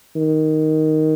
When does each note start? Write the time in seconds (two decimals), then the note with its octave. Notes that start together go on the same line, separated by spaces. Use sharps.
0.16 D#3